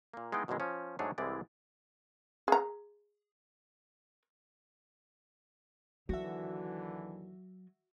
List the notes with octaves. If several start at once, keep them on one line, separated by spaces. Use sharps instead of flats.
A#2 A#3
G#3 B3 D#4 E4 G5
F#2 B2 D3 D#3 G#3 E4
F3 C#4
G#2 F#3 A3 D4 G#4 C#5
C2 E3 G#3 C4 E4 D5
G#4 A#5
D#2 D3 E3 F#3 F#4 E5